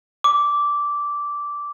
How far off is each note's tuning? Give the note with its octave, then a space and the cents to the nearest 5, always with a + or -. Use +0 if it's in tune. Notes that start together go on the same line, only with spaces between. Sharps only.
D6 -10